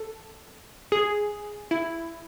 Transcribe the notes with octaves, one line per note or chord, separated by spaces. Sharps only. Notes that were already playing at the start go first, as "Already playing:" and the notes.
Already playing: A4
G#4
E4